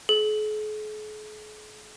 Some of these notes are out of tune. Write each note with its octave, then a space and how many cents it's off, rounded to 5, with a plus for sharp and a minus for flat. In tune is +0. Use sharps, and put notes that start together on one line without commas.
G#4 +45